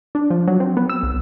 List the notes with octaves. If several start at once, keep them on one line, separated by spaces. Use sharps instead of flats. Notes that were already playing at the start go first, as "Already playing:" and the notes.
D4
F3
F#3
C4
B3
E6
B1